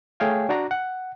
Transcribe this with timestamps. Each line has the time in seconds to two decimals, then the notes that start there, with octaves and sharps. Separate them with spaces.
0.20 A3 G#4 C#5 F5 G5 G#5
0.49 D4 F#4 D5 A#5
0.71 F#5